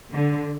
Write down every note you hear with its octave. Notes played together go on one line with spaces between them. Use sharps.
D3